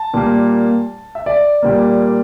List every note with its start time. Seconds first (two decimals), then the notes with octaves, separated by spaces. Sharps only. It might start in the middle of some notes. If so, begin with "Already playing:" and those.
Already playing: A5
0.14 A#2 G3 A#3
1.15 E5
1.26 D5
1.62 A#2 G3 A#3